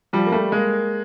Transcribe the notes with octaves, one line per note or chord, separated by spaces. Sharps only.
F3 G3
A#3
G3 A3
G#3 A#3